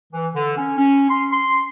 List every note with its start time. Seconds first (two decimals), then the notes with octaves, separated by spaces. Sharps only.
0.13 E3
0.35 D3
0.57 C#4
0.78 C#4
1.10 C6
1.31 C6